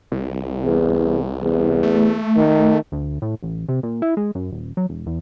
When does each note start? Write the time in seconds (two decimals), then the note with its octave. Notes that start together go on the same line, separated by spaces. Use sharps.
0.12 C2
0.64 E2
1.42 E2
1.83 A3
2.37 D#3
2.92 D2
3.22 A2
3.43 A1
3.69 C3
3.83 A#2
4.02 E4
4.17 G#3
4.35 F#2
4.52 D#1
4.77 F#3
4.89 E1
5.06 E2